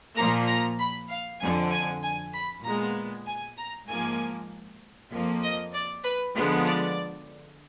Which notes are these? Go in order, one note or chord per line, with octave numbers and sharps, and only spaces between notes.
A#2 F3 A#3 A#5
A#5
B5
F5
F2 D3 F3 G#5
G#5
G#5
B5
A#2 G#3 B3 A#5
G#5
A#5
G#2 F3 A#3 G#5
F2 F3 A#3
D#5
D5
B4
D3 F3 G#3 B3
D5